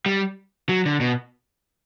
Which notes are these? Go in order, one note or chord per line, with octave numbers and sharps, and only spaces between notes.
G3
F#3
D3
B2